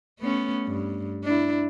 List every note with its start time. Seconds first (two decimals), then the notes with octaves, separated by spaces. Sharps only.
0.20 A3 B3 C#4
0.67 G2
1.24 D4 E4